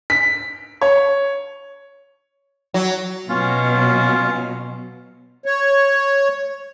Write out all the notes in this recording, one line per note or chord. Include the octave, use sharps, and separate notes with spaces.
B6
C#5
F#3
B2 F#3 C#4 F4
C#5